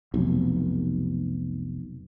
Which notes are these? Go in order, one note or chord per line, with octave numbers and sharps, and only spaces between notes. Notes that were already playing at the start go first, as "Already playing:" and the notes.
F1 B1